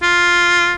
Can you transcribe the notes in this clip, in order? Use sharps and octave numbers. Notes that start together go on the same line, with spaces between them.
F4